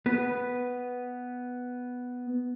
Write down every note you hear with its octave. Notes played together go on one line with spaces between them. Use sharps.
B3 B4